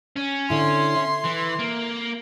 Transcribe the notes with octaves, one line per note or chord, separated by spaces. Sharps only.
C#4
D3 E4 C6
E5
E3
A#3